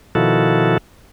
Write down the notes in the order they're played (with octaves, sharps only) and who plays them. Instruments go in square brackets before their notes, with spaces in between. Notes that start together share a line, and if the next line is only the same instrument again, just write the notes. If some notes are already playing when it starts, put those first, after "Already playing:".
[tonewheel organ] B2 D#3 F3 E4 F#4 A4